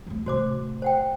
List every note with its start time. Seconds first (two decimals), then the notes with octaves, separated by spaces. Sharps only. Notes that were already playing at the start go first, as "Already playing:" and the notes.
0.07 F2 A2
0.26 A2 C3 F#4 C5 D6
0.82 C5 F#5 G5